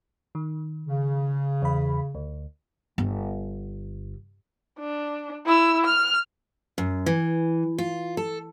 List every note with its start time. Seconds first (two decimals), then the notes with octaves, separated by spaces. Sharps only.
0.35 D#3
0.87 C#3
1.62 E2 B5
2.15 D2
2.98 G1
4.79 D4
5.46 E4 E6
5.85 F6
6.78 F#2
7.06 E3
7.78 F4
8.17 A4